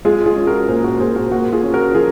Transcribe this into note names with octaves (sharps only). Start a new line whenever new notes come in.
G#3 F4 G#4
F4 G#4
C#4
F#4 A#4
A#2 G#4 C5
F#4 A#4
A#2 G#4 C5
F#4 A#4
A#3 F#4
F4 G#4
C#4
F#4 A#4
F3 F4 G#4